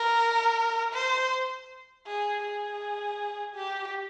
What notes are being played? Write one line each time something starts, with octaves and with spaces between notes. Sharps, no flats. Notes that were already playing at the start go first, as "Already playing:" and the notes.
Already playing: A#4
C5
G#4
G#4
G4